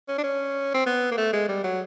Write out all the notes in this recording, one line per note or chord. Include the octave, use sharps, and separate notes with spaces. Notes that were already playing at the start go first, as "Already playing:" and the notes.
C#4
D4
C#4
C4
B3
A#3
A3
G#3
G3
F#3